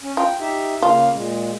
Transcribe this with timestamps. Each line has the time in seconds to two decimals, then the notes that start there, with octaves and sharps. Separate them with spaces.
0.03 C#4
0.17 F4 G5
0.40 D#4 G4 E5
0.82 C#3 A#3 F4 F5
1.14 A#2 G#3